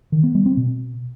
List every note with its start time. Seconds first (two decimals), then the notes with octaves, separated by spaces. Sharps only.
0.12 D#3
0.23 B3
0.35 G3
0.46 C4
0.57 B2